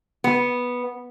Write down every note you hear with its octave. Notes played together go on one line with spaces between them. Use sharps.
B3